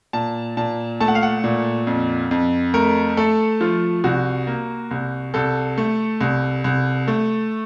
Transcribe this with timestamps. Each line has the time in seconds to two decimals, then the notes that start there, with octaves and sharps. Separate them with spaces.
0.13 A#2 A5
0.57 A#2 A5
1.00 A3 A5
1.08 F#5
1.15 F5
1.23 F#5
1.44 A#2
1.87 F2
2.31 F2
2.74 A3 A#4
3.17 A3 A4
3.61 F3 F4
4.04 C2 F#4
4.47 A#3
4.91 C2
5.34 C2 A4
5.78 A3
6.21 C2
6.64 C2
7.08 A3